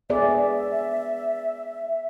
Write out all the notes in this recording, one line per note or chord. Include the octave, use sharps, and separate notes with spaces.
B3 G#4 D5 E5